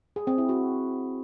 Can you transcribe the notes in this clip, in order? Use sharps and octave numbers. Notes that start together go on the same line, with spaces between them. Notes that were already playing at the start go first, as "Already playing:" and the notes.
G#4
C4
E4
F#4